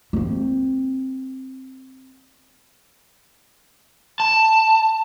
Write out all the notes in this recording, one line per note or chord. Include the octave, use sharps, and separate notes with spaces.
A#3 C4
A5